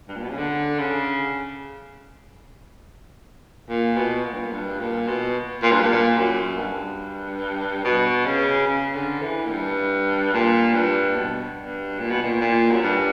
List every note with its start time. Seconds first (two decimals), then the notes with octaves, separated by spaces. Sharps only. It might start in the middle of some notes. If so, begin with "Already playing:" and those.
0.08 G2
0.16 A#2
0.23 B2
0.30 C#3
0.37 D3
0.79 C#3
3.69 A#2
3.97 B2
4.25 A#2
4.33 G2
4.41 A#2
4.52 G2
4.80 A#2
5.08 B2
5.63 A#2
5.72 G2
5.80 A#2
5.91 A#2
6.18 F#2
6.59 G2
7.84 B2
8.26 C#3
8.67 C#3
8.95 D3
9.22 E3
9.45 A#2
9.50 G2
10.33 A#2
10.74 G2
11.15 B2
11.58 G2
11.99 A#2
12.11 B2
12.22 A#2
12.41 A#2
12.71 F#2
12.82 G2